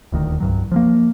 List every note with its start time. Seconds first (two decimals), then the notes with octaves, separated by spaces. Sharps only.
0.12 D#1 D2 D#3
0.40 C2 G2 F#3
0.72 F3 G3 A#3